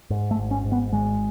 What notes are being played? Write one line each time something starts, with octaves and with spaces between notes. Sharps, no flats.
G#2
A3
G#1
C#4
G#2
B3
G#1 G#3